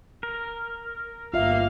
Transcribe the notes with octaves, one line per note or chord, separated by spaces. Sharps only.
A#4
G1 G2 A#3 F4 E5 F5